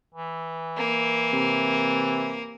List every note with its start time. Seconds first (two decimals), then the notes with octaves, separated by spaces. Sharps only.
0.14 E3
0.77 A#3
1.33 C3